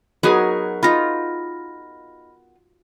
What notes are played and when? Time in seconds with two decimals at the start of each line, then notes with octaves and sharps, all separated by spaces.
0.23 F#3 B3 D#4 G#4 A#4
0.83 D#4 F4 B5 F6 A#6